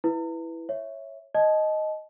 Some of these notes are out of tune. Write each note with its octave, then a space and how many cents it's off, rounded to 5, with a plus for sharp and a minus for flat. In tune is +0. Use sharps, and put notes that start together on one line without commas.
E4 +0 B4 +0
C#5 -10 E5 +0
D#5 +0 A5 -30